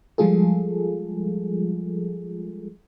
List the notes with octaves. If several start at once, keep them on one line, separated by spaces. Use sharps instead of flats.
F3 G3 G#3 F4 G#4 A4